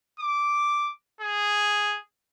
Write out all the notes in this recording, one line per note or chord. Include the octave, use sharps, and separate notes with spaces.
D6
G#4